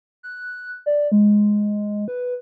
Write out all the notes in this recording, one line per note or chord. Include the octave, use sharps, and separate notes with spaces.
F#6
D5
G#3
B4